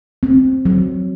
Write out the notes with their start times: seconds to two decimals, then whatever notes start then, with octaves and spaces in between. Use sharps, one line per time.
0.23 C4
0.65 F#3